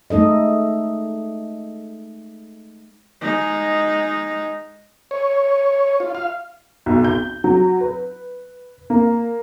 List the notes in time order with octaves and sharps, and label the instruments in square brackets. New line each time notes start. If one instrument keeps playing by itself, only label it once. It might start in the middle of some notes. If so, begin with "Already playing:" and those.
[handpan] G#3 A3 D#4 A4 D#5
[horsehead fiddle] G#3 D#4
[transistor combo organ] C#5
F4
F5
[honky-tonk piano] B1
G6
F#3
B4
A#3